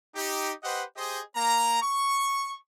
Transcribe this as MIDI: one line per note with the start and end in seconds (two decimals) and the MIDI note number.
0.16 0.52 63
0.16 0.52 67
0.63 0.84 67
0.63 0.84 71
0.63 0.84 72
0.63 0.84 75
0.63 0.84 78
0.97 1.21 67
0.97 1.21 68
0.97 1.21 72
0.97 1.21 75
1.36 1.77 58
1.36 1.77 82
1.83 2.54 85